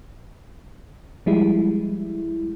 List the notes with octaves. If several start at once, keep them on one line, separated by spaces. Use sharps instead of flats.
F3 G3 G#3 E4